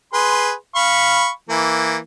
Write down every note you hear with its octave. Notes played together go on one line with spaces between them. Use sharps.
G#4 B4 C6
F5 B5 C#6
E3 A#3